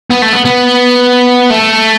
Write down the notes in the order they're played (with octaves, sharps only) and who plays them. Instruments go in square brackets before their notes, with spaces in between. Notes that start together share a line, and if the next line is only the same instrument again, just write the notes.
[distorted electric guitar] B3
A3
B3
B3
A3